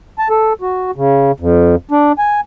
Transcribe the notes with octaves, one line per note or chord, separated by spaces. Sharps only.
A5
A4
F#4
C#3
F2
D4
G#5